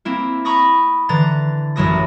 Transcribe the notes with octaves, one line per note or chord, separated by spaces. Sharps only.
A#3 C4 E4
A#5 B5 C#6 D#6 A#6
D3 E3 A#5 A6
A1 F#2 F#3 E4 D#6 A#6